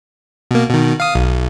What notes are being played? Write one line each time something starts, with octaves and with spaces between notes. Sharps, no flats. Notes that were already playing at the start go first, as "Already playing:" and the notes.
B2 A#3
B2 D#3
F5 D#6
B1